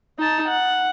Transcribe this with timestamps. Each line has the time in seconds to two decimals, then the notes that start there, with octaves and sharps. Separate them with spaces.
0.19 D#4 A5
0.49 F#5